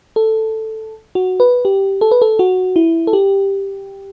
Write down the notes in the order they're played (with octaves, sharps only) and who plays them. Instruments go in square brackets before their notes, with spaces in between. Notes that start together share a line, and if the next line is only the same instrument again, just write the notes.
[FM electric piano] A4
F#4
B4
G4
A4
B4
A4
F#4
E4
A4
G4